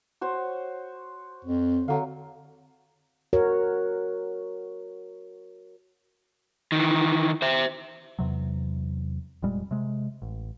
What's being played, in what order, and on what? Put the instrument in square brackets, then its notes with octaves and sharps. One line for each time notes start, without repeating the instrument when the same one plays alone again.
[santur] F#4 C5 C#5
[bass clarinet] F2
[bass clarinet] D3 [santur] F#3 F5
[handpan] F#4 A#4 C#5
[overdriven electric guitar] D#3 E3
C5 E5
[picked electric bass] E2 C3 F#3
F1 A#2 G3 G#3
C3 G#3
A1